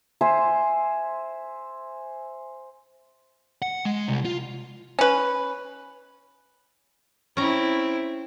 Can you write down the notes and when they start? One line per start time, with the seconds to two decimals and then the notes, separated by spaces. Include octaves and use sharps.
0.21 C5 E5 G#5 C6
3.62 F#5
3.85 G#3
4.08 C2
4.25 F4
4.99 C#4 B4
7.37 C4 C#4 E4 A#5